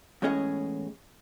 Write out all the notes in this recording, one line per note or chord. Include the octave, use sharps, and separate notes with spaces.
E2 A2 G#3 C#4 G#4 D#5